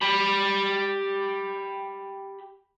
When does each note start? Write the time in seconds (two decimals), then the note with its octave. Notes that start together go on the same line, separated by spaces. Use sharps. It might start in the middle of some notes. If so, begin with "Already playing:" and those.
0.01 G4 B5